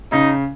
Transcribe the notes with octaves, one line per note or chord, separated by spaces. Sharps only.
C#3 D#4